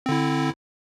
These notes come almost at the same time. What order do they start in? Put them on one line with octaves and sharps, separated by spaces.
C4 D3 E4